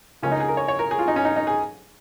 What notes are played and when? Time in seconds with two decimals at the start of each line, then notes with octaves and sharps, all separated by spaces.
0.23 C#2 C#3 F3 A#3 C#4
0.32 D#4
0.40 G#4
0.48 A#4
0.57 C#5
0.68 C#5
0.79 A#4
0.91 G#4
0.99 F4
1.08 D#4
1.16 C#4
1.25 D#4
1.36 D#4
1.47 G#4